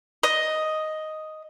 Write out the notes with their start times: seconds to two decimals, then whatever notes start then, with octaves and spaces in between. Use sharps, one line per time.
0.23 D#5